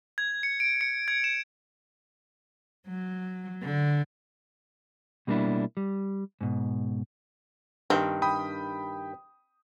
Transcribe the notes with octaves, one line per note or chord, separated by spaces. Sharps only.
G#6
C#7
D7
C#7
G#6
E7
F#3
D3
B2 G3 A#3 B3 D4 E4
G3
G#2 B2
G2 D#3 C4
G5 B5 D#6